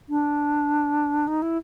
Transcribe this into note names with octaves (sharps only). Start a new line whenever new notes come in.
D4
D#4
E4